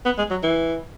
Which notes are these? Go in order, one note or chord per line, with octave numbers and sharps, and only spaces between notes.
B3
G#3
F#3
E3